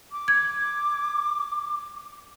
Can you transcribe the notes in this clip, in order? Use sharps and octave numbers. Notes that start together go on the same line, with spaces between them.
D6
G#6